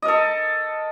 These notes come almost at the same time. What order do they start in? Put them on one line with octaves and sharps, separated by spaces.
D#5 A#4 A4